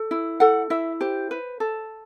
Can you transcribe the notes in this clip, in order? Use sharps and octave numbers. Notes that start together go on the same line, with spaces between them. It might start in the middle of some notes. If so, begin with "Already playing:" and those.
Already playing: A4
E4
A4 F#5
E4 E5
G4 C5
B4
A4